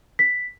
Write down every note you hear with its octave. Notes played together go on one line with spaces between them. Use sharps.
B6